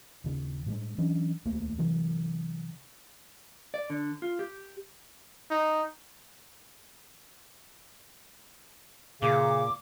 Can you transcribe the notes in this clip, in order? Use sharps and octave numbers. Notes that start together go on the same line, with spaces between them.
D#1 C#3
A2 G3 G#3
E3 F#3 C#4 D4
D#1 C#2 A3 A#3
C3 E3 F#3 G3
D5
D3
F4
G4
D#4
A#2 C#3 D6